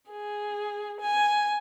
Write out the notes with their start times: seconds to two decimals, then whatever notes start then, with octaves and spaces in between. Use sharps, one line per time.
0.11 G#4
1.02 G#5